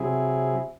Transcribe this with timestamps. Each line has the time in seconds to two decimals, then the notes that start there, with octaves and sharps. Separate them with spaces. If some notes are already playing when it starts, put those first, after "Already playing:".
Already playing: C3 F#3 C4 E4 G#4